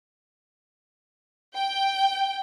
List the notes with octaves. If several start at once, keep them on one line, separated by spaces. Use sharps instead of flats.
G5